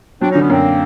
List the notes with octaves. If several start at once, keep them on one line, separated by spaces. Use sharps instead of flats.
F#3 C4 D4
C#4 D#4
D3
B3 C#4
F#2 A#3 C4